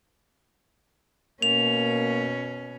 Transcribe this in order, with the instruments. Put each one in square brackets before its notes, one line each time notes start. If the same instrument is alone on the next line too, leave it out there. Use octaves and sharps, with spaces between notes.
[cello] B2 C#4 [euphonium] A#3 [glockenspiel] F7